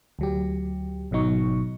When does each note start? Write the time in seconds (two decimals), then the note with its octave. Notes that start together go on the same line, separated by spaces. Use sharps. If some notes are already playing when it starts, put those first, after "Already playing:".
0.19 D2 F#3 G4
1.11 G#1 B2 F#3 D#4 C#6